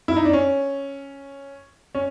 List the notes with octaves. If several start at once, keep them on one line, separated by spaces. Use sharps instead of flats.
E4
D#4
D4
C#4
C#4